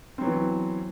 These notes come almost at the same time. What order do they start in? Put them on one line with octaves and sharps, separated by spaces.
C4 F#3 B3 E3